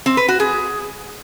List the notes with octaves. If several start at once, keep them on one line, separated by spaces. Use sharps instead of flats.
C4
B4
F#4
G#4